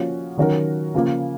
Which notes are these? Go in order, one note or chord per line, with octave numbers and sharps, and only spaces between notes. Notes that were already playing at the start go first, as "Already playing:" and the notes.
Already playing: F3 A#3 C#4 F#4
D#3 F#3 C#4 F#4 A#4
C#3 F3 A#3